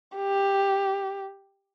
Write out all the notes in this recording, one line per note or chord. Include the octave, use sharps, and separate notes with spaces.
G4